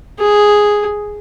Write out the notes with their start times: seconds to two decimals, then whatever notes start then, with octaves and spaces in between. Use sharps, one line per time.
0.19 G#4